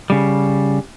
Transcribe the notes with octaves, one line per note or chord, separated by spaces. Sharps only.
C#3 G3